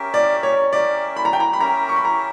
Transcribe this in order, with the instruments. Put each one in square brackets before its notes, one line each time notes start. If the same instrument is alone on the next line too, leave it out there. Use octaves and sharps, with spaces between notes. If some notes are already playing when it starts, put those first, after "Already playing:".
Already playing: [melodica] C#4 G4 A#4 E5
[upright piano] D5
C#5
[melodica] C#4 G4 A#4 E5 [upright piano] D5
[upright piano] B5
A#5
G5
A#5
B5
[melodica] C#4 G4 A#4 E5 [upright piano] A#5
[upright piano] C#6
B5
A#5